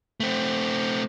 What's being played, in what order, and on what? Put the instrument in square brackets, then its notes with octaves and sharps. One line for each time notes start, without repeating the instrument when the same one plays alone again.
[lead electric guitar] A3 C4